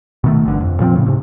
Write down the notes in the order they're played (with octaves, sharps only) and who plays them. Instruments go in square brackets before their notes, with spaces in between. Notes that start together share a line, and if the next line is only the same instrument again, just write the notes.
[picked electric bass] B2 D#3 A3
G#1 G2 D3
F2
A#2 F3 F#3 C4
A2 C#3
G#2 C3